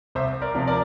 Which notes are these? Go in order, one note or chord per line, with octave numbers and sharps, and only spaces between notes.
C2 C5 E5
A#4 D5
C3 F3
A#4 D5